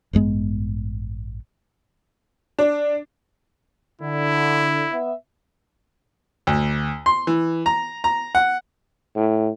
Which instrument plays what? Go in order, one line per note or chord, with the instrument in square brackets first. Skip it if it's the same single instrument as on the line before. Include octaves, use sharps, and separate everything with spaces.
[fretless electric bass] A1 G2 G#3 B3
[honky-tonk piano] D4
[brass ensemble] D3 [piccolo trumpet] E4
[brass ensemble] B3 E5
[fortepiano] D2
C6
E3
A#5
A#5
F#5
[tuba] A2